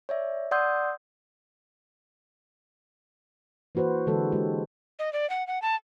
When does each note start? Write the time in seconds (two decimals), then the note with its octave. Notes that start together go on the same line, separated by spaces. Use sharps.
0.09 C#5 D5 E5
0.51 D5 F#5 C6 D#6 E6 G6
3.75 E3 A#3 F#4 B4 C5
4.07 D3 E3 F#3 G#3 A4
4.32 G#3 F#4 G4
4.99 D#5
5.13 D5
5.30 F#5
5.47 F#5
5.62 A5